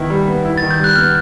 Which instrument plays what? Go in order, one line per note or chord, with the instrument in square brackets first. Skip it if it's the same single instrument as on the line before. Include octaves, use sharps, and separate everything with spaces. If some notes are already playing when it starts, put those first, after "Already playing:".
Already playing: [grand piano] D#3 B3 E4
G3
B3
E4
[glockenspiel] A6
[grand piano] D#3
[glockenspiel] G6
[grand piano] G3 [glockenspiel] F#6
[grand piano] B3 [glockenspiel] F6